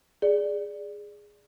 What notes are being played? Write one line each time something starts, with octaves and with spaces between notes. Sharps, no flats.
G#4 D5